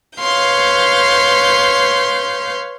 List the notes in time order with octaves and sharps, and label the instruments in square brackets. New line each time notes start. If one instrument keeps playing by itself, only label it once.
[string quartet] B4 C#5 F5 C6 G6